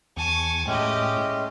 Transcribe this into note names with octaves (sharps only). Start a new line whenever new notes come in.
E2 G#5 A5 C#6
A2 G#3 A3 C#4 G4 D#5